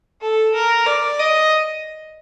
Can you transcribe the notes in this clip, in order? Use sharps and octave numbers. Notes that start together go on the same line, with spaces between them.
A4
A#4
D5
D#5